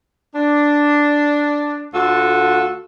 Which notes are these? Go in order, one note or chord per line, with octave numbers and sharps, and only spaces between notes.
D4
D2 F4 F#4 A4